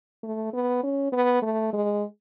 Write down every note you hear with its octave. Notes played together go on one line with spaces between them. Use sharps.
A3
B3
C#4
B3
A3
G#3